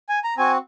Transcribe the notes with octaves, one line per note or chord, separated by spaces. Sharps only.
G#5
A#5
C4 F#4 G#5